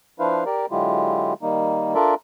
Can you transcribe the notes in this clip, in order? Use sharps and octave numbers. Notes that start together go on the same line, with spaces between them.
F3 D4 E4 B4 C5 F5
G4 A#4 D5
D3 F#3 G#3 E4 F4 G4
D#3 G3 A#3 D#4
D4 F4 A4 A#4 D5 E5